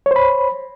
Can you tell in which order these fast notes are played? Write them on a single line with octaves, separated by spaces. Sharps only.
C#5 C5 B5